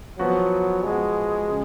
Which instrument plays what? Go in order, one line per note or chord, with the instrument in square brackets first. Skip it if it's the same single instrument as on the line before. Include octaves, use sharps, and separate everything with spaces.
[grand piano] F3 B3 F#4 [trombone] F#3
[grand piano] F3 B3 F#4 [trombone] G#3
[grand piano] C#3